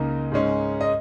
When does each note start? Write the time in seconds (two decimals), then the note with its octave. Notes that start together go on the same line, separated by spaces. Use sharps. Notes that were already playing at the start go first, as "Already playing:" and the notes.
Already playing: C#2 C#3 A#3 D#4 A#4 D#5
0.32 G#2 G#3 C#4
0.81 D#5